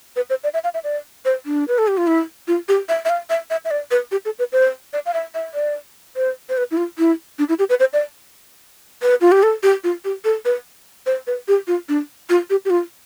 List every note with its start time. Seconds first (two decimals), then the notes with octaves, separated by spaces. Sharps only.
0.16 B4
0.30 C5
0.44 D5
0.54 E5
0.64 F5
0.74 E5
0.84 D5
1.25 C5
1.46 D4
1.68 B4
1.78 A4
1.88 G4
1.97 F4
2.07 E4
2.48 F4
2.68 G4
2.89 E5
3.05 E5
3.09 F5
3.30 E5
3.50 E5
3.65 E5
3.71 D5
3.91 B4
4.12 G4
4.25 A4
4.39 B4
4.52 C5
4.93 D5
5.06 F5
5.14 E5
5.34 E5
5.54 D5
6.16 C5
6.49 C5
6.57 B4
6.71 E4
6.77 F4
6.98 E4
7.39 D4
7.49 E4
7.59 G4
7.70 B4
7.80 C5
7.93 D5
9.02 B4
9.21 F4
9.32 G4
9.43 A4
9.63 G4
9.84 F4
10.05 G4
10.25 A4
10.45 B4
11.06 C5
11.27 B4
11.48 G4
11.68 F4
11.89 D4
12.29 F4
12.50 G4
12.65 G4
12.70 F4